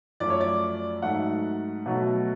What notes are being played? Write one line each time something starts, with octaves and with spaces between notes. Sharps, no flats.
F#2 F3 A3 D5
C#5
D5
G#2 F#3 A3 F#5
B2 F#3 A3